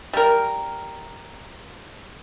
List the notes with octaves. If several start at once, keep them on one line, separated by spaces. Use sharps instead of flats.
G3 A#4